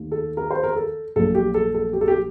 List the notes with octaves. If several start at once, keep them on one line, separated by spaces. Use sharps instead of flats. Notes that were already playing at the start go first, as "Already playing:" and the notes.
Already playing: D#2 D#3 A3
A4
A#4
C5
A#4
A4
A#1 A#2 F#3 A3 A4
G4
A4
A4
G4
A4
G4